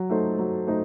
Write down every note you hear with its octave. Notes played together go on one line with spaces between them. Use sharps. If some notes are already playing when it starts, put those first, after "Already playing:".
Already playing: F#3
A3 D#4 A4 C5
F#3
A3 D#4 A4 C5